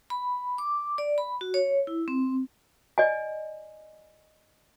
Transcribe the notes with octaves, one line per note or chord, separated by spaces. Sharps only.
B5
D6
D5
B5
F#4
C#5
E4
C4
D5 D#5 G#5